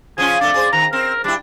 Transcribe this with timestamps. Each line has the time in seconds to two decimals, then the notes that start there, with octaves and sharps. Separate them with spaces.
0.18 F3 C#4 F4 G#4
0.41 F2 A3 D4 D5
0.54 G#4 A#4 C5
0.73 D#3 A#5
0.93 C4 A#4
1.24 G3 D4 E4